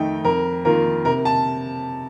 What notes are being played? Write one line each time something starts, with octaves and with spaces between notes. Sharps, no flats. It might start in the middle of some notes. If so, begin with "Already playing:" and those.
Already playing: F2 D#3 A3 D#4 G5
F2 A#4
D#3 A#3 F4 A#4
C3 A#4
A5